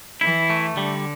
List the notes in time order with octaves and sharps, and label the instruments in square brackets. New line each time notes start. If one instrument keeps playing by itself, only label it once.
[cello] E3 [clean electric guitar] E4
[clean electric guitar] A3
[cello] D3 [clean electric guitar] G3